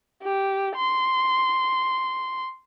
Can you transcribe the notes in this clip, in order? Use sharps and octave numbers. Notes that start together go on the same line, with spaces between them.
G4
C6